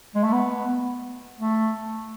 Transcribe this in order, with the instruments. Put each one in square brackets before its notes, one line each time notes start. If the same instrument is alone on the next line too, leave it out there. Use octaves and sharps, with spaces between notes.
[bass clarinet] G#3
A3
B3
A3